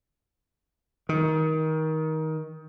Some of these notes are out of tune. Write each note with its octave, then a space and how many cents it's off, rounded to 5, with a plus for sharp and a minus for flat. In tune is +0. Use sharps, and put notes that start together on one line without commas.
D#3 +20